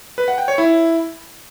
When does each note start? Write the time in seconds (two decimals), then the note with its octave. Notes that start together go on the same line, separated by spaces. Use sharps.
0.18 B4
0.28 F#5
0.38 G5
0.48 C#5
0.58 E4